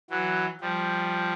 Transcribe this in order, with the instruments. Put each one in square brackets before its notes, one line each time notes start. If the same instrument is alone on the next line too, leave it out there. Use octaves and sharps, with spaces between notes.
[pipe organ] E3 F#3
F3 G3